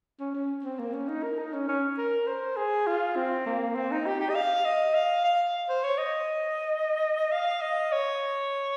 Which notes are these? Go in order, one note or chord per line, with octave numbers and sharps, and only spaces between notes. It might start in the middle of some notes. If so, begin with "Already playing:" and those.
C#4
C#4
C4
A#3
C#4
D#4
A#4
D#4
C#4
C#4
A#4
C5
G#4
F4
C4
A#3
C4
D#4
G4
G4
D#5
F5
D#5
F5
F5
C5
C#5
D#5
F5
D#5
C#5